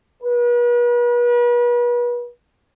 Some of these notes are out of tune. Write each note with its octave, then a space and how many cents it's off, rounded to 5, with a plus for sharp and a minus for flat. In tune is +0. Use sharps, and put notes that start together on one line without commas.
B4 -40